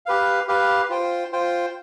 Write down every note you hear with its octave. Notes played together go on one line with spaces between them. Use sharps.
G4 B4 F5
G4 B4 F5
F4 C5 G5
F4 C5 G5